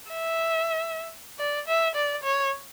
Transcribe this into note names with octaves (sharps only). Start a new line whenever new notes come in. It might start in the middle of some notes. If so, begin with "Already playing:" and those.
E5
D5
E5
D5
C#5